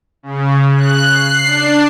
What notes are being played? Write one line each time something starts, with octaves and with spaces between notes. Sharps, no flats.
C#3
F#6
C7
D4